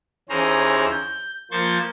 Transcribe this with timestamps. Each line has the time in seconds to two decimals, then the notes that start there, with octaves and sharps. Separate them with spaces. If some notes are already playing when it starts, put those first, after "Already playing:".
0.29 D#2 E3 C#4 G#4 C5 A#5
0.92 G6
1.51 F3 A#3 C5 C#6 G6 A6